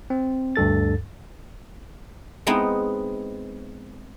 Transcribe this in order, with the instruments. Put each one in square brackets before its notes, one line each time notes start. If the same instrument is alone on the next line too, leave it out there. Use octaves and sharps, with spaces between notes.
[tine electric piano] C4
D2 G2 A4 A6
[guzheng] G#3 B3 C4 D#4 E4